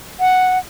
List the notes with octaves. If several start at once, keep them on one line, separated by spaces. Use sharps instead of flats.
F#5